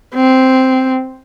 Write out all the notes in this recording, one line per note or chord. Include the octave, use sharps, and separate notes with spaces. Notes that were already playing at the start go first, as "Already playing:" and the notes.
C4